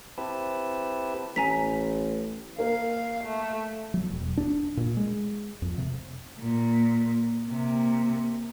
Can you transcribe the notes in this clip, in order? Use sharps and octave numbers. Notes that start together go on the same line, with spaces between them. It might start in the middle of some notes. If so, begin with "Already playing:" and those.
C4 E4 G4 B4 A5
A1 G#5 A#5 B6
A#3 A#4 F5
A3
F#3
E1
D4
A#2
G#3
F2
C3
A#2
C3 A#3